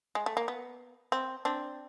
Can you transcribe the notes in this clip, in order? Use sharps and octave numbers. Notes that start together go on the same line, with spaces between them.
G#3
A3
A#3
B3
C4
C4 D4